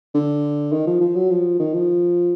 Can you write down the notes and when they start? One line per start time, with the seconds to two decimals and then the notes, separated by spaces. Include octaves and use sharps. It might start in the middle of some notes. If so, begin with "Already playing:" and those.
0.14 D3
0.72 D#3
0.87 F3
1.01 F3
1.15 F#3
1.30 F3
1.59 D#3
1.74 F3